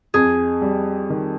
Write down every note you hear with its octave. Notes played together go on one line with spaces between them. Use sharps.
F2 G#4
G3
D#3